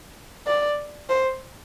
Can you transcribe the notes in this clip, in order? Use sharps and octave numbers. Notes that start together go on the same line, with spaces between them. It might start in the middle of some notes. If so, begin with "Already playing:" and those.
D5
C5